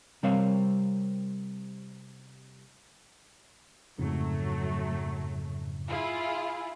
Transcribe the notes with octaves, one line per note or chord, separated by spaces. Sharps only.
C3 G3 C4 A#4 C#5 F5
F2 G#2 C#3 F#3 A3
E4 F4 G#4